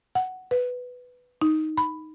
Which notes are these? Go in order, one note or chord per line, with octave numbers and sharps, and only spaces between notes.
F#5
B4
D#4
B5